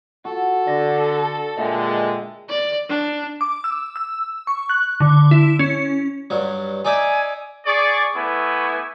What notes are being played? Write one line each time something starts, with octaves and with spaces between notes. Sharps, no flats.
F#4 A4
D3 D5 A#6
A#2 D3 G#3 D#5 E5 G5
D5
D4
D6
E6
E6
C#6
F#6
D3
E4
C#4
G2 F#3
D#4 D5 E5 G#5
G#4 D5 C#6
A3 B3 E4 G#5 C#6 D6